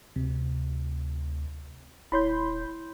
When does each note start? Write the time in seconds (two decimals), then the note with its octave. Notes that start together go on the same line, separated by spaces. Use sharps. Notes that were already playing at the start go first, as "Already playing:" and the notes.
0.16 D2 C3
2.12 D#1 E4 C#5 B5 C6 G6